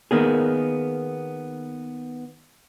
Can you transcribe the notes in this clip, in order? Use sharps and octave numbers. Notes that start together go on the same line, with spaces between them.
D#3 A#3 B3 G#4